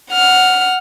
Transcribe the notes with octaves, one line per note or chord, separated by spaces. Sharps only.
F#5 F6